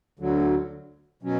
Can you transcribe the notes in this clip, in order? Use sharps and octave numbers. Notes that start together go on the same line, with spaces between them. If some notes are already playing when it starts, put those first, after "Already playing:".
D2 D3 F#3
B2 F#3 C#4